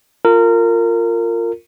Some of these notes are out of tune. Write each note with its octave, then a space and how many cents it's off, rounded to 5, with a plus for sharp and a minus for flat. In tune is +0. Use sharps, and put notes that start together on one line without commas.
F4 +0 A#4 -25